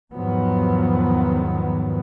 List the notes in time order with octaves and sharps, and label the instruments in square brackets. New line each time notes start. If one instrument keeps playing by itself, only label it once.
[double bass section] E2 G#2 D#3 F3 F#3 B3